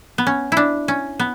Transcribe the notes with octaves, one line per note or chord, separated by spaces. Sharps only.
B3
C#4
D4 E4
C#4
B3